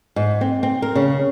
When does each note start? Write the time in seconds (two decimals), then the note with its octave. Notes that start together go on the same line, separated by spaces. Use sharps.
0.16 G#2
0.41 C4
0.63 C4
0.82 A#4
0.95 C#3